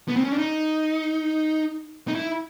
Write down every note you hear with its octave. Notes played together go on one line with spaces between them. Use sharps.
B3
C4
C#4
D4
D#4
D#4
E4